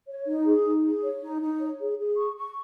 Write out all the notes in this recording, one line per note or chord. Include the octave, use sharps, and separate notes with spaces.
C#5
D#4
G#4
D#4
G#4
C#5
D#4
D#4
C#5
G#4
G#4
C#6
C#6